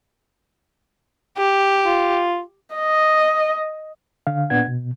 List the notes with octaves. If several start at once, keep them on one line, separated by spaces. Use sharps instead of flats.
G4
F4
D#5
D3 F5
A#2 B3 D4 F#5 G#6
B2